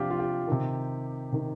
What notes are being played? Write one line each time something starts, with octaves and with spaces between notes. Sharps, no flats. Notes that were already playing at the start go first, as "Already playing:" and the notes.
Already playing: C3 F3 D4 F4 G4
F4
G4
C3 D#3
C3 D#3